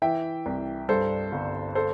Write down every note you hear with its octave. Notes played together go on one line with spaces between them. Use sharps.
E3 E5 G5
C2
G2 A4 C5
G1
A4 C5